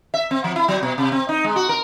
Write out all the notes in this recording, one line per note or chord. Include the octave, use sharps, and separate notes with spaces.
E5
C4
F3
E4
F#3
B2
C3
C4
D#4
G#3
F#4
A#4